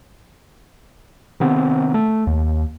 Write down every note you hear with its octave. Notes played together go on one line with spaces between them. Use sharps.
C3 D#3 B3 C4
A3
D#2